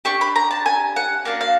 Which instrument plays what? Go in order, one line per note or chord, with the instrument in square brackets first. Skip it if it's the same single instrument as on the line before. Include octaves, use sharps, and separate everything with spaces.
[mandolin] D4 G4 C#6
B5
A#5
A5
G#5
F#5
A#3 D4 F#4 F5
F5